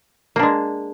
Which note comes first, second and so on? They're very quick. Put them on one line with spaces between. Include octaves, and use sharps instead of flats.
A#3 D4 G#3